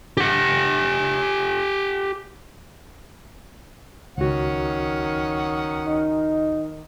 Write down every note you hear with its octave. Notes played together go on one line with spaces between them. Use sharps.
G4 F#5
C#2 D#3 C#4 F#4 F#5
D#4